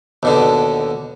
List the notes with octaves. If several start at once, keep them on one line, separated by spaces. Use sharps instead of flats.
D#2 B2 D3